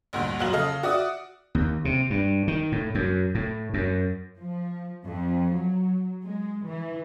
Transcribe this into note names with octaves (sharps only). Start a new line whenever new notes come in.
A1 D2 G2 A#2
F2 A#2 F#3 F5 F#7
C#3 A4 D#5 F5 F6
F#4 D5 E5 D#6
D#2
C3
G2
D#3
A2
F#2
A2
F#2
F3
F2
F#3
G#3
E3